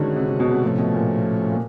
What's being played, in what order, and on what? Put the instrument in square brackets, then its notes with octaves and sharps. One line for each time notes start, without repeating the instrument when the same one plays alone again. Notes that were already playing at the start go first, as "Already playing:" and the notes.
Already playing: [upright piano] D3 D#3 [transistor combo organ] G#3 C#4 F#4
[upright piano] C3
C3
B2
C3
[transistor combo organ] A2 F3 A3 C#4 [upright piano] C3
[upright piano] B2
A#2
A#2